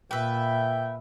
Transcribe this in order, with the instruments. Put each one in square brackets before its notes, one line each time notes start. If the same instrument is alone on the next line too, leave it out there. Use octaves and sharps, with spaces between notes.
[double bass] A#2 [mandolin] B4 E5 [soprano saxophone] G5